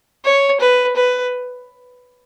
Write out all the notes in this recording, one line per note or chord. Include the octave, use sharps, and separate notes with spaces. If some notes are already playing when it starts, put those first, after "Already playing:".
C#5
B4
B4